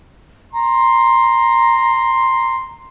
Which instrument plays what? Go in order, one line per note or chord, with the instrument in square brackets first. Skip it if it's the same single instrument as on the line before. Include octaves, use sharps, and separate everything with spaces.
[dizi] A#5 [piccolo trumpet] C6